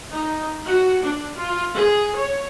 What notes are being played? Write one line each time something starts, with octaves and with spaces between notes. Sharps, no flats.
D#4
F#4
D4
F4
G#4
C#5